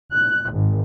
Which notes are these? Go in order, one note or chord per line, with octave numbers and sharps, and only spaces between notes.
F#6
G#1